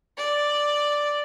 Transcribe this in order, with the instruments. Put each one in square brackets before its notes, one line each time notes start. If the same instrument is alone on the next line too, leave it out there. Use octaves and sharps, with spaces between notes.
[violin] D5